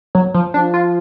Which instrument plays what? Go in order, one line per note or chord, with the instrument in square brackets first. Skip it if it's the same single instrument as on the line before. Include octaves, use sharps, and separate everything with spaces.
[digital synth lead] F#3
F3
[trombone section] F3 [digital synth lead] D4
[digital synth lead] F4